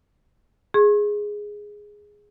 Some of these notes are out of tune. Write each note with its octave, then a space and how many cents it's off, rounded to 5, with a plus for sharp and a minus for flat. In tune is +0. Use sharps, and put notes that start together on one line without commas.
G#4 +0 C#6 -45